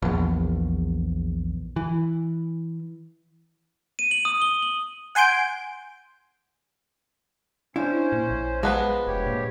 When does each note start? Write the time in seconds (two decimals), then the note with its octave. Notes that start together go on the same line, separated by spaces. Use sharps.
0.02 A#1 E2
1.76 E3
3.99 D#7
4.11 F#7
4.25 D#6
4.42 G7
4.62 F#7
5.15 F#5 G#5 C6 G6 D7
7.76 C#4 D4 E4 C5
8.12 A#2
8.30 A#1
8.63 F3 G#3 B3 B4
9.07 F1 G2 G4 C#5
9.27 A#2